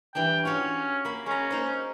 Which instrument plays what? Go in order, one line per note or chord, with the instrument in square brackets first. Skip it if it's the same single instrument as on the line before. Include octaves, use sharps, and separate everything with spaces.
[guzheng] E3 G3 D4 [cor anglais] G5
[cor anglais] C#4 [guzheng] F4 F#4 C#5
[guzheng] A#3 B5
[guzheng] G#3 A#5 [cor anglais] C#4
[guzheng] A#3 D#4 C5